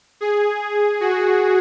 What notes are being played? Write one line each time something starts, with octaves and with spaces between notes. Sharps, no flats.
G#4
F#4